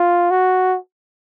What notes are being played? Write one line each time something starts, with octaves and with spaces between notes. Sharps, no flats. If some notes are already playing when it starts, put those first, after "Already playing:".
Already playing: F4
F#4